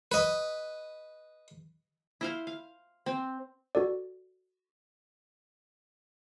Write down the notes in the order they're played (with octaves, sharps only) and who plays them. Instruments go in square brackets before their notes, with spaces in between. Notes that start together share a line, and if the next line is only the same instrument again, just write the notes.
[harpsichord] B4 D#5
[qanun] E4 C5 F5
F5
C4
[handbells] F#4 A4 D5